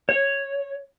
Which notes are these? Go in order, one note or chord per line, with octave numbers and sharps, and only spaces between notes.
C#5